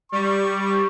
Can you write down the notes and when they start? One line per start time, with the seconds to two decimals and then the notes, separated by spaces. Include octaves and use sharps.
0.12 G3 C#6